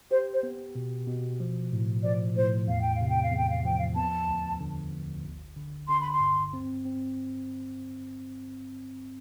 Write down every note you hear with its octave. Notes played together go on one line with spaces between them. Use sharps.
G4 C5
C5
B3
B2
B2
F3
A2
F3 D5
A2 C5
E2 F5
G5
F5
C3
G5
F5
E2
G5
F5
F3 G5
F5
B3 A5
D2
D3
D2
G1
D3
D3 C6
B5
C6
G2
C4
C4